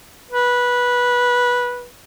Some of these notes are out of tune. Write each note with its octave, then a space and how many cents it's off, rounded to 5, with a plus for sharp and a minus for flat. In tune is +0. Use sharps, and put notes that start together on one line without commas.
B4 -15